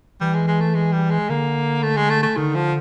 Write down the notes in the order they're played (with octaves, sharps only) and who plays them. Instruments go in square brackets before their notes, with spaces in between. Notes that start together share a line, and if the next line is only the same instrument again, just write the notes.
[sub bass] E3 [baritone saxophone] G3
[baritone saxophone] G#3
G#3
A3
G#3
G3
G#3
[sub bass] D3 [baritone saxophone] A#3
[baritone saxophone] A3
G#3
A3
A3
[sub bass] D3 [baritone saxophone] D#3
[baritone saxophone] F3